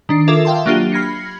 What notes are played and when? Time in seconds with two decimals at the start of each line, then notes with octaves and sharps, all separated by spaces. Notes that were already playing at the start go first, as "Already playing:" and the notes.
0.09 D#3 D4 C7
0.28 F4 A4 A#4 E5 D6 G#6
0.45 E5 F5 G5 A5 C6
0.66 F#3 A#3 D4 F4 G4 D#7
0.92 B5 F6 G#6 A#6 C7 C#7